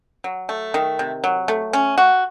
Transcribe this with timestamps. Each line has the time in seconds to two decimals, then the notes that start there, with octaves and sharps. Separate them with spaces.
0.24 F#3
0.49 A3
0.74 D#3
0.99 C3
1.24 F#3
1.48 A3
1.73 C#4
1.98 F#4